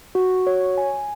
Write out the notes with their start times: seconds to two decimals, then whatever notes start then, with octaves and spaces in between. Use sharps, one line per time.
0.15 F#4
0.47 C#5
0.78 G#5